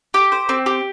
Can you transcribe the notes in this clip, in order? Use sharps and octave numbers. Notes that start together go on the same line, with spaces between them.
G4
C5
C4
G4